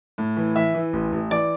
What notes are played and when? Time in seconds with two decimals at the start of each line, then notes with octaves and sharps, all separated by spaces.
0.18 A2
0.37 E3
0.56 E3 E5
0.75 E3
0.93 A1
1.12 A1
1.31 E3 D5